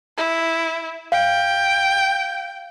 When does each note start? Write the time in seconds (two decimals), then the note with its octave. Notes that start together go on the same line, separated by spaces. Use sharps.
0.17 E4
1.12 F5 G5